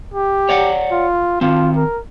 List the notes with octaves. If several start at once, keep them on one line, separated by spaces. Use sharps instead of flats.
G4
C#5 D5 F#5
F4
D#3 C4 F4
A#4